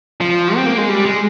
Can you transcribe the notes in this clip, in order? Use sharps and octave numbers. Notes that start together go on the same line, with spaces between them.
F3
C4
A#3
G#3
G3
G#3